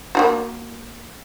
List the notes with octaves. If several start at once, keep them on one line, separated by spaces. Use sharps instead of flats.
A#3 F4 F#4